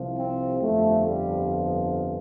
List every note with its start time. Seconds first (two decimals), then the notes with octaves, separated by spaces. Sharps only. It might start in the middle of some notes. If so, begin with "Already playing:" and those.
Already playing: C2 C3 F3
0.17 C4
0.62 G1 F2 F3 A3
1.07 G3